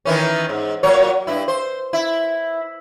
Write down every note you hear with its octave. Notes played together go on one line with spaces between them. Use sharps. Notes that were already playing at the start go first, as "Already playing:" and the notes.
D#3 E3 C#4
G#2
A#2 F#3 C#5
G2 E4
C5
E4